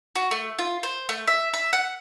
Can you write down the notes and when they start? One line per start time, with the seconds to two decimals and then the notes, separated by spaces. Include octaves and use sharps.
0.16 F#4
0.31 A3
0.59 F4
0.83 C5
1.09 A3
1.27 E5
1.54 E5
1.73 F#5